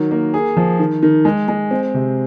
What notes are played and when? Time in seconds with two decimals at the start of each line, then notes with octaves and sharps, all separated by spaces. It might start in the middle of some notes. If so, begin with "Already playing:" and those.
Already playing: D#3 F#3
0.11 A#3
0.34 G#4
0.57 F3
0.79 D#3
1.03 D#3
1.25 G#3
1.48 G#3
1.71 C4
1.94 C3